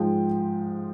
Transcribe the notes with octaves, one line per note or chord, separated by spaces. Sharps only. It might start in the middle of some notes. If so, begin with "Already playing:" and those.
Already playing: G#2 F3 G#3 G5